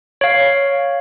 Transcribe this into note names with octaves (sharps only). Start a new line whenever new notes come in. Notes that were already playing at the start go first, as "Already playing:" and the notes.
C#5 F5